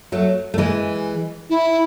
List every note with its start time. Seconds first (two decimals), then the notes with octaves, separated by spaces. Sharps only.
0.12 F#3 A3
0.54 A3
0.58 E3 G#3
1.50 E4